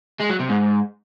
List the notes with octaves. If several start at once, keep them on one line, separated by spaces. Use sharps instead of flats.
G#3
F#3
C3
G#2